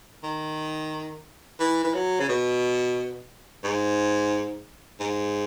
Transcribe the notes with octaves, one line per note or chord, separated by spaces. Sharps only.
D#3
E3
E3
F#3
C#3
B2
G#2
G#2